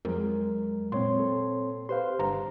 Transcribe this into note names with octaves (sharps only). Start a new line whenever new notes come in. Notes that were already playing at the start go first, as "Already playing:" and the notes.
F2 F#3 G#3 A#4
A#2 C4 C#5 C6
A4
G4 B4 C5 F5 C6
G1 A#5